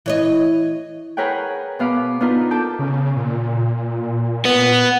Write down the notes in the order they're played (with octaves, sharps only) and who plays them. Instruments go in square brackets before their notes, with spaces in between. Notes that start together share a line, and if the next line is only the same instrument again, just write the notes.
[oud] E3 C#5 D#5
[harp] G#4 A#4 B4 C#5 F#5 G5
B2 B3 F5 B5 D6
B3 D4 D#4 F4 A#4 B4
A4 A5 D6 G6
[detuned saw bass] C#3
A#2
[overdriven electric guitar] B3